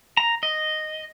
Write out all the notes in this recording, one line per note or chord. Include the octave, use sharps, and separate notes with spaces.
A#5
D#5